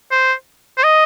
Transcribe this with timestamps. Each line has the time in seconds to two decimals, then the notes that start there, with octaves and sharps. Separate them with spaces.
0.11 C5
0.78 C5
0.84 D#5